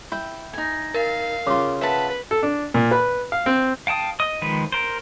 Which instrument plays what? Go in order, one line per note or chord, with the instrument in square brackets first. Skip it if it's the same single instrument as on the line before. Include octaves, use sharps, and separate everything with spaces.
[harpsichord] E4 [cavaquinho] G5
[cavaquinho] D#4 G#5
[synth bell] A#4 [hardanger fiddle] F5
[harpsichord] C#3 F4 [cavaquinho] D6
[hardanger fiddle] B4 [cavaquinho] E5 F#5 A5
[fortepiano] A4
D4
A#2
B4
F5
C4
[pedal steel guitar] F5 G5 A5 D#6
D#5 D#6
D#3 F3 G#3 B4
A#4 C5